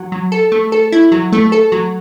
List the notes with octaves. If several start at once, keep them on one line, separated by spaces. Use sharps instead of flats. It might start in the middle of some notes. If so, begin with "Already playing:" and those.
Already playing: F#3
F#3
A4
A3
A4
E4
F#3
A3
A4
F#3